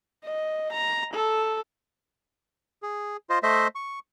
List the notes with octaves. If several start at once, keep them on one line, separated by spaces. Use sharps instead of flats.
D#5
A#5
A4
G#4
F4 C5 D#5
A3 C5 D#5 E5
C#6